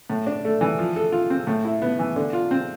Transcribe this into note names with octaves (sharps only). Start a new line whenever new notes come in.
A2
D4
A3
E3
F3
A4
F4
C4
A2
E4
B3
E3
D3
F4
C4